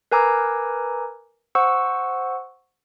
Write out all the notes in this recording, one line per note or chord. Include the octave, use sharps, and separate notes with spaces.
A#4 B4 G#5 A#5 D6 E6
C5 F#5 C#6 E6